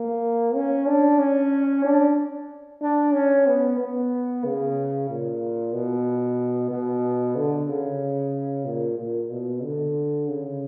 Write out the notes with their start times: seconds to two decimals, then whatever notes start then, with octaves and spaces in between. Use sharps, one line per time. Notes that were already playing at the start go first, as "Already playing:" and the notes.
Already playing: A#3
0.55 C#4
0.87 D4
1.19 C#4
1.84 D4
2.82 D4
3.13 C#4
3.47 B3
3.79 B3
4.44 C#3
5.09 A#2
5.73 B2
6.71 B2
7.36 D3
7.68 C#3
8.67 A#2
8.99 A#2
9.30 B2
9.64 D3
10.28 C#3